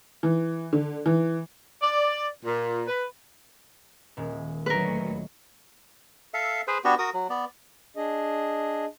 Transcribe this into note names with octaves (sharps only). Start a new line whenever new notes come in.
E3
D3
E3
D5
A#2
B4
D#1 G#3
D2 F#3 A#4 B4
A4 E5 F5
G#4 B4 C5
B3 D4 F#4 G4
F#4 A#4 D#6
F#3
B3 D5
D4 G#4 D#5